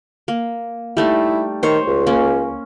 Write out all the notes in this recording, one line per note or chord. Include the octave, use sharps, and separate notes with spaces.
A#3
G3 A3 D#4 E4
D#3 C5 C#5
C#2
A#3 C#4